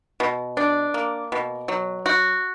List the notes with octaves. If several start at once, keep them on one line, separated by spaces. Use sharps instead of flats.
B2
D4
A#3
B2
F#3
F#4